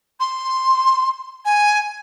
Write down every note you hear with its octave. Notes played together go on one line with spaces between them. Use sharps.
C6
G#5